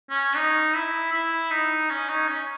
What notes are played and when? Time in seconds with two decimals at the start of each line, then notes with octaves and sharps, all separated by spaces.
0.10 C#4
0.36 D#4
0.75 E4
1.12 E4
1.51 D#4
1.90 C#4
2.09 D#4
2.28 C#4